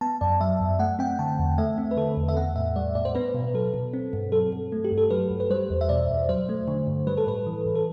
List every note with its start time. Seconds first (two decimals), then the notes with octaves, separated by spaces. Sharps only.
0.01 B3 A5
0.21 F#2 D5
0.41 F#3 E5
0.60 F#2
0.79 A3 F#5
0.99 C4 G5
1.19 D3 A5
1.39 E2
1.58 A3 E5
1.78 C4
1.91 B4
1.97 D3 A4
2.17 E2
2.29 E5
2.37 B3 F#5
2.56 A2 E5
2.76 G3 D5
2.95 A2 D5
3.05 C5
3.15 B3 B4
3.34 B2
3.54 F#3 A4
3.74 B2
3.93 C4
4.13 G2
4.32 F#3 A4
4.52 G2
4.72 A3
4.84 G4
4.92 G2
4.98 A4
5.10 F#3 B4
5.30 G2
5.40 B4
5.50 G3 C5
5.70 E2
5.81 E5
5.89 B2 D5
6.09 E2
6.29 F#3 C5
6.49 A3
6.68 D3
6.87 G2
7.07 G3 B4
7.17 A4
7.27 A2 B4
7.47 E3
7.66 A2
7.75 A4